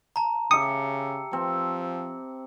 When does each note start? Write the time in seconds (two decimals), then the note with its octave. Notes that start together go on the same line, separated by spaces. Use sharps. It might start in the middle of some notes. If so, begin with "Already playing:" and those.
0.16 A5 A#5
0.51 C#3 G4 E5 D#6 C#7
1.33 F3 C4